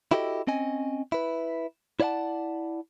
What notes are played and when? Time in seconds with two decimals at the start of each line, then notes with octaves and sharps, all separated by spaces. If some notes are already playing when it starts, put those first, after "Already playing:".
0.12 E4 F#4 G4 A4 C5 D#5
0.47 C4 C#4 D#5 G#5
1.12 E4 B4
2.00 E4 C#5 D5 F5 F#5 A5